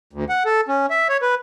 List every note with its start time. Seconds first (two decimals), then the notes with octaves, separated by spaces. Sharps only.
0.13 D2
0.29 F#5
0.46 A4
0.69 C#4
0.90 E5
1.09 C#5
1.22 B4